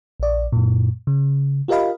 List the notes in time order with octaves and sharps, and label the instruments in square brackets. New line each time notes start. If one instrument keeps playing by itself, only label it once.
[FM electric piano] A#1 D5
F#2 A#2
C#3
F4 G4 A#4 D#5 F5 B5